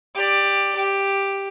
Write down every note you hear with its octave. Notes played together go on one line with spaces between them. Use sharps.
G4 D5
G4